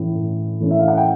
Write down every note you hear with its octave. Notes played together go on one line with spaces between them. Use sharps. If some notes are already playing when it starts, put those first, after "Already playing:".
Already playing: A2 E3 A3 C#4 E4
A2
E3 A3 C#4 E4
E5
F5
F#5
G5